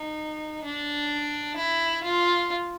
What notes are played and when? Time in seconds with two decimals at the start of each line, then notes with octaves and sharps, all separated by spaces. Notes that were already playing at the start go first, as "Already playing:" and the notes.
Already playing: D#4
0.64 D4
1.57 E4
2.04 F4